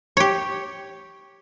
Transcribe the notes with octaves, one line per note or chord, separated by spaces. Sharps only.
G4 C#5